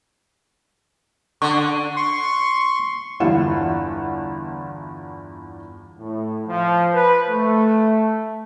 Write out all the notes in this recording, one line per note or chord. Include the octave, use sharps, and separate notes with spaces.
D3 C#6
C6 C#6
G1 E2 E4 F4 F#5 E7
A2
F3
B4
A3